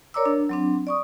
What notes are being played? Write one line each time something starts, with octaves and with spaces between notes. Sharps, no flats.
A#4 C#5 D5 A#5 D6 E6
D4
F#3 C4 D4
D5 C#6 D#6